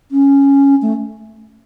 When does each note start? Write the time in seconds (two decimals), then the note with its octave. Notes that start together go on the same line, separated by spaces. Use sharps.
0.11 C#4
0.82 A3